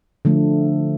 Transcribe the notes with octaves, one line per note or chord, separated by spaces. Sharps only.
D3 F3 A3